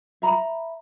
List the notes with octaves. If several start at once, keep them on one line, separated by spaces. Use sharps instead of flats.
E5 A#5 B5